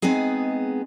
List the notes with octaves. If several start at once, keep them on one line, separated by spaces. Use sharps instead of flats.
G#3 B3 C4 D#4 G#4